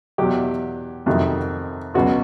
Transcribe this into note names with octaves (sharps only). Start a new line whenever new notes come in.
E2 B2 F#3 G4
F2 C3 D#3 F#3
C#2 B2 F#3 F#4